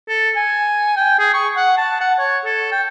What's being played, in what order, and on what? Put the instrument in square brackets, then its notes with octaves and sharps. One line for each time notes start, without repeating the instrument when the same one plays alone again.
[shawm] A4
G#5
G5
G#4
C#6
F#5
A5
F#5
C#5
A4
G5